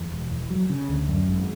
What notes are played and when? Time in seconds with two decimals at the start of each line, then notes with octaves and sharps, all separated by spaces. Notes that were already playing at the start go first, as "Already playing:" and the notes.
Already playing: E2
0.12 E1
0.31 E2
0.50 F#3
0.70 C#3
0.89 D2
1.08 F#2
1.28 G#1